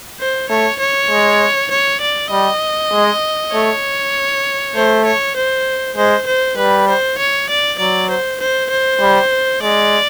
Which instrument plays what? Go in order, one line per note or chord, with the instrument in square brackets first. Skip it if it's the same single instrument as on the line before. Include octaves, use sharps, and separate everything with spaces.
[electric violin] C5
[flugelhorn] A3 [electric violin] C#5
[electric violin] C#5
[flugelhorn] G#3
[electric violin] C#5
D5
[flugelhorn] G3 [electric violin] D#5
[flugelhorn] G#3
[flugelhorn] A3 [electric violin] C#5
[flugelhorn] A3 [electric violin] C5
[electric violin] C#5
C5
[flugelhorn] G#3 [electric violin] C5
[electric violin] C5
[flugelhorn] G3 [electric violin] B4
[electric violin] C5
C#5
D5
[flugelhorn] F#3 [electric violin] D5
[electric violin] C5
C5
C5
[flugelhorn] G3
[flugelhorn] G#3 [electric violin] D5